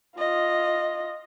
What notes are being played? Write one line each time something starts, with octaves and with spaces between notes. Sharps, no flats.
F4 D#5